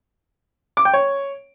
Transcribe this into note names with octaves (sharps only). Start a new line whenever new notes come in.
D6
G5
C#5